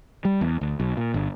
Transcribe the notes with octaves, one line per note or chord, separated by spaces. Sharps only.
G3
E2
D2
B1
A#2
G1